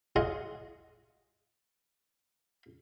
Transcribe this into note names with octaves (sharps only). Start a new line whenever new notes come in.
G#4 D#5 F5 F#5 C6